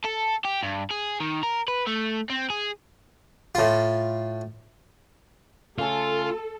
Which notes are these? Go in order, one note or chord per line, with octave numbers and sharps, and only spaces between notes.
A4
G4
G2
G#4
D#3
A#4
B4
A3
C4
G#4
A2 F4
C#3 A3 F4 A4 G#5